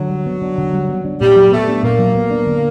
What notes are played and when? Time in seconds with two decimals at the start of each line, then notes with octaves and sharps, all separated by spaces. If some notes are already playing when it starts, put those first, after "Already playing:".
Already playing: D3 F#3
0.10 G3
0.26 B3
0.42 D4
0.58 D3
0.73 G3
0.89 B3
1.05 D4
1.21 A#2 G3
1.36 F#3
1.52 A3 B3
1.68 D4
1.83 A#2 A#3
1.99 F#3
2.15 B3
2.30 D4
2.47 D3